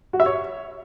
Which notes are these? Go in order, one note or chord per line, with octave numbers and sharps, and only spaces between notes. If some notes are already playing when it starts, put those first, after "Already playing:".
F#4
E5
C#5